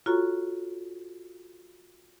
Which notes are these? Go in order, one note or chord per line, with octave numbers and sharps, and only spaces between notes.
F4 F#4 A4 C#5 A#5 C#6